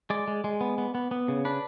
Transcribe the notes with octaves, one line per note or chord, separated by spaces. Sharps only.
G#3 D5
G#3
G#3
B3
B3
B3
B3
C#3
D4 B4